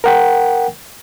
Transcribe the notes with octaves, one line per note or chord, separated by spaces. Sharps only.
A#4 F#5 G5